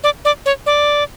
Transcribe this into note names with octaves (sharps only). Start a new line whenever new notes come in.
D5
D5
C#5
D5